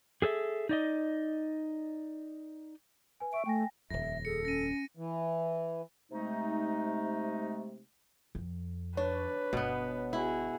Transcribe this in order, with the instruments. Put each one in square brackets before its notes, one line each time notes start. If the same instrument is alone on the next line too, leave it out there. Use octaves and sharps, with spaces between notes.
[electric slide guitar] G#4 A4 C5 E5
D#4 D5 D#5
[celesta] B4 G#5
[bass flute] E5 [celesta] C#6 D7
[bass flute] A3 [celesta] G5 G#5 A#6
[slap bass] D#1 F2 [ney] E5 [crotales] A#6
[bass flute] G#4 [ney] A4 [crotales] C#7
[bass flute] C#4 [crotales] A#6 D#7
[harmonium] E3
[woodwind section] C3 G#3 A3 D#4
[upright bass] F2
[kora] D4 [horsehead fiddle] B4 [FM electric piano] C#5
[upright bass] G1 [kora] B2 B3
[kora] E4 [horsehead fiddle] F#4 G#4